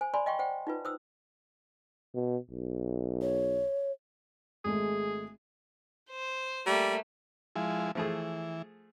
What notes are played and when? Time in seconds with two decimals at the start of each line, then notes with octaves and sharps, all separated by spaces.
0.01 C5 G#5
0.14 D5 G#5 B5 C6
0.26 D#5 F5 G5 C6 C#6
0.39 C5 F#5 G5
0.67 D#4 F4 B4
0.85 C5 D#6 E6
2.15 B2
2.50 B1
3.22 C#5
4.65 G#1 G#3 A3 G#4
6.10 C5
6.66 G3 A3 A#3
7.56 F3 G#3 E4
7.95 E3 F3 A3 G#4